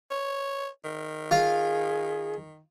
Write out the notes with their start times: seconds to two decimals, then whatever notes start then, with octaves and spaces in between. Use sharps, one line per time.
0.11 C#5
0.85 D#3
1.31 F4 G#4 F5